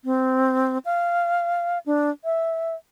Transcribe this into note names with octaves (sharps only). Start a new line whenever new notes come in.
C4
F5
D4
E5